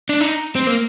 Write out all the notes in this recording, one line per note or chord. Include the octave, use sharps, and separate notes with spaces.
D4
D#4
C4
A#3